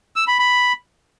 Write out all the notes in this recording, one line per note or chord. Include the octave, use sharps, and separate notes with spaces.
E6
B5
B5